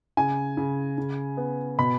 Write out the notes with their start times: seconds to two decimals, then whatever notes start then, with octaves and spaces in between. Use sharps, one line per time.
0.17 C#3 G#5
0.57 C#3
0.98 C#3
1.37 B3
1.78 B2 B5